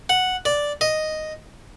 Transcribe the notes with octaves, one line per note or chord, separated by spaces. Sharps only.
F#5
D5
D#5